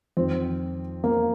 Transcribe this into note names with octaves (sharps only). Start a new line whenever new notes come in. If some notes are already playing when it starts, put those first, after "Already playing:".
F2 D#3 C4
A#3
C4